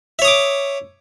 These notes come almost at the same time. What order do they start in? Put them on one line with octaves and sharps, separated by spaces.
E5 C#5 D#6 D6